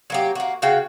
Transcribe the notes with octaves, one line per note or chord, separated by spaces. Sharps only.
F#3 A#3 G4
A#3 F#4
C#3 F#4 F5 G5